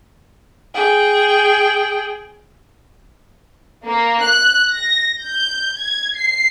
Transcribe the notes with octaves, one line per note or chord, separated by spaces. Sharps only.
G#4 G5
A#3
F#6
A#6
G6
G#6
C7